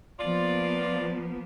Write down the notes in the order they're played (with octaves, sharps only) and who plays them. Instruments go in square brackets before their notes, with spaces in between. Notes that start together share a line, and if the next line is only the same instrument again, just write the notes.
[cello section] F3 A#3 B3 [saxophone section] F4 D5